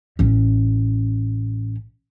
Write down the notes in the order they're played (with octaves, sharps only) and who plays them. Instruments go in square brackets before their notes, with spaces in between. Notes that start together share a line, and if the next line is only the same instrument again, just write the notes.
[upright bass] A1 C#4